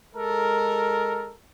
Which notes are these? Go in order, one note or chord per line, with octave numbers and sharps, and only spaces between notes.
G#3 A4 A#4